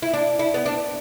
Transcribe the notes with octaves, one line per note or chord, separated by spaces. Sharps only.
E4
D4
E4
B3
D4